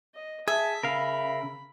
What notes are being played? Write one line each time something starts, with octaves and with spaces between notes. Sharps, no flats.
D#5
G#4 E5 A5
C#3 A#4 F5 B5